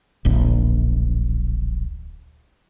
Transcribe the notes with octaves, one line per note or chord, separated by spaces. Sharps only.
D1 A#1